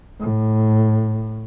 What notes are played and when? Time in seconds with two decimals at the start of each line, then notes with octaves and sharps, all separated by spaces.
0.20 A2